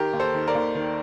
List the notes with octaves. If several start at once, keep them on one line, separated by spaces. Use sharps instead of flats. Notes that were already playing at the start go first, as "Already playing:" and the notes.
Already playing: D#3 G4 A#4
D#2
A4 C5
D#3
A#4 D5
D#2
D#3